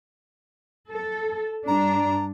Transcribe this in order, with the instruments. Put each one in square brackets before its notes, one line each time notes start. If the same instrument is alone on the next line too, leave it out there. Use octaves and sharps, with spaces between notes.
[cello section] A4
[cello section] G2 D4 [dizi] A#5